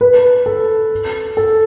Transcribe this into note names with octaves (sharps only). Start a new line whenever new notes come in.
B4
A4
A4